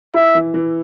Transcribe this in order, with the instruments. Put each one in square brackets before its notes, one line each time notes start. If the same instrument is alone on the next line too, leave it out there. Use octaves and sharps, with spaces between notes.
[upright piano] E4 [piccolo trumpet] E5
[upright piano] E3
E3